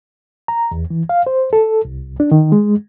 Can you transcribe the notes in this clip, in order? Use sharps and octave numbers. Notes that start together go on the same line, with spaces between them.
A#5
E2
E3
F5
C5
A4
C2
D4
D#3
G#3